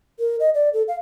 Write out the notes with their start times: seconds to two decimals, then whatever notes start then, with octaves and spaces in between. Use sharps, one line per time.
0.19 A#4
0.40 D#5
0.54 D5
0.74 A4
0.88 F5